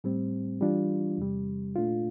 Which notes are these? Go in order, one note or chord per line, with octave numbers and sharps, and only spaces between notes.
A2 G3 C4
E3 G3 D4 F4
E2 C3 G3
A#2 A3 D4 F4